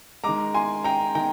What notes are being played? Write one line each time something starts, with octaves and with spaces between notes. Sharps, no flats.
D#3 G#3 A#5 D6
G#5 C6
G5 A#5
D#3 G5 A#5